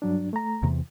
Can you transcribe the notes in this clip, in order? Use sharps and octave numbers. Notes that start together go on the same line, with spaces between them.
G2 F#3 D4
A3 A#5
E2 C3 E3